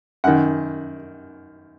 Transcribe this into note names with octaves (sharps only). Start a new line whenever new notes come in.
F#2 D#3 F#5